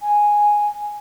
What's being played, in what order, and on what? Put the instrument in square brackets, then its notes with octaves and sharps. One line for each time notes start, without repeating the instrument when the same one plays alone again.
[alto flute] G#5